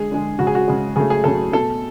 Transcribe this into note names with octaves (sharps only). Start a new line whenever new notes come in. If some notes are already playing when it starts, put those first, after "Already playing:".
Already playing: D3 G#3 G#4
D3 G#3
C#3 G#3 F#4
G#4
F#4
C#3 G#3
C#3 F#3 A3 G#4
G#4
C#3 F#3 A3 A4
B2 A3 A4